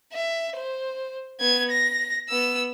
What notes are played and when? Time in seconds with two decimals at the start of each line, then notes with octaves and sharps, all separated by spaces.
0.13 E5
0.56 C5
1.40 B3 G#6
1.71 A#6
2.29 B3 E6